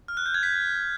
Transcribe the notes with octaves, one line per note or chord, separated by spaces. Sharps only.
F6
F#6
G6
G#6
B6